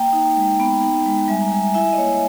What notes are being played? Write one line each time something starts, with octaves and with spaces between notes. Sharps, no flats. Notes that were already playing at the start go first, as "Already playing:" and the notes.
Already playing: A#3 G5 A#5
D#4
G#3
B3
D#4
G#3
G3 E5 G#5
A#5
G3 E5 G#5
E4 E5 G#5
D#5
A#3 C#5 E5